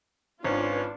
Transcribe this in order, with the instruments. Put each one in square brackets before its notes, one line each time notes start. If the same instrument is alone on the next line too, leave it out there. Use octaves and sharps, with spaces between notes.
[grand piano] G#1 [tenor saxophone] C#4 [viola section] D4 F4 B4